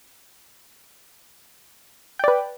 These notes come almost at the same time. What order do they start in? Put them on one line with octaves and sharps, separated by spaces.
G5 D5 B4